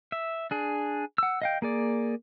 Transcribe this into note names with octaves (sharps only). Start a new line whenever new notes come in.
E5
D4 G#4
F#5 E6
D#5 F5 G5
A#3 G#4 D5